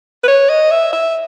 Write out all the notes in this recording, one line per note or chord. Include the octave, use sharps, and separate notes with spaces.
B4
C#5
D#5
E5
E5